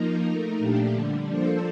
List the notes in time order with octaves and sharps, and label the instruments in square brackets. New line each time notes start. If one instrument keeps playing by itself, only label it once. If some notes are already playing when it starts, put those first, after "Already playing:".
Already playing: [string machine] F3 A#3 D#4 A#4
A3 D#4 A#4
A#2 F3 A3 D4 G4
D3 G3 D4
F3 A#3 D4 A4 C5